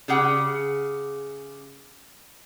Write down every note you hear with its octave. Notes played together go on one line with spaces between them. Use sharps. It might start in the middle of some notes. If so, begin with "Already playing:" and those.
C#3 G4 G#4 F#5